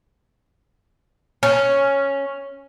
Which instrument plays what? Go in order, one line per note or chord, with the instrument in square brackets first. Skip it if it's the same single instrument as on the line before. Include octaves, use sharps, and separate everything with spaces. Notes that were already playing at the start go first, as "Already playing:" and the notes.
[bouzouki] C#4